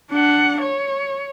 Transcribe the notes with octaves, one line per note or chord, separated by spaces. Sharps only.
D4 F#5
C#5